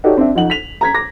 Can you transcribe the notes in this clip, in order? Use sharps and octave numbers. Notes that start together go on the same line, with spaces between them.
D#4 F#4 G4 A4 C#5 D5
C4 D4 E5
F2 D#4 F#5 F#7
B6 F7
A#5 G#6 B6
D6 A#6